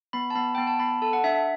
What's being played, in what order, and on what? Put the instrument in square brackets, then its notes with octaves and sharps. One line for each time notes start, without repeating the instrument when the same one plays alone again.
[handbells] B3 B5
A5
B3 B5
B3 G5
A5
B3 B5
A4 A5
F#5
D4 E5
E5